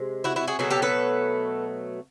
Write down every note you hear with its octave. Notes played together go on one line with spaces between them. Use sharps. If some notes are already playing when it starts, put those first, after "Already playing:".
Already playing: C3 G#3
E4 F#4
E4 F#4
F#4 G#4
B2 F#3 A3 F#4 G#4
G4 A4
A4 B4